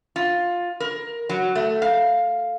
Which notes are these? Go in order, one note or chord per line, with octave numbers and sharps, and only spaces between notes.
F4
A#4
F#3
A3
F5